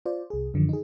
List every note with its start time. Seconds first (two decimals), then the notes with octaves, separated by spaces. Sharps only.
0.06 F4 C5 D5
0.30 C2 G#4
0.54 F#2 D3 D#3 F3
0.69 D#4 G#4